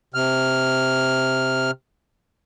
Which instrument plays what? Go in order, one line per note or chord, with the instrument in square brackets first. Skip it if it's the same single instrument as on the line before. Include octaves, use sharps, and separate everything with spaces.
[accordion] C3 F6